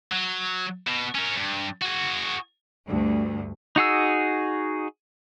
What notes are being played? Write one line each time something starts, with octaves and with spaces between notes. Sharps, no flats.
F#3
B2
C#4 A#4
G2
F#4 G#4
D2 G2
D#4 F#4 G#4 E6